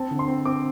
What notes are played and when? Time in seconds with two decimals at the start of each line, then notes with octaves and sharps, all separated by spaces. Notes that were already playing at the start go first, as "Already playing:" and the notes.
Already playing: C4 A5
0.11 D3
0.19 C6
0.28 C4
0.46 C4 D6